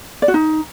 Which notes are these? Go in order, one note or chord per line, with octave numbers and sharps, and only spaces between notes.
D5
F#4
D#4